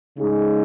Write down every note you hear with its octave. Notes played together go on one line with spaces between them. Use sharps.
C#3 G#3 D#4 G#4